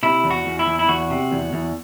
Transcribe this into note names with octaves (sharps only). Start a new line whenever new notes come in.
C3 E4
E2
F#4
E2
E4
E2
E4
E2 F#4
C3
E2
E2